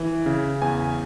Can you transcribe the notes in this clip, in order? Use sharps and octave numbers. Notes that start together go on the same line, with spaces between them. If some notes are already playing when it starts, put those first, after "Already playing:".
Already playing: E3
C#3
E2 G#5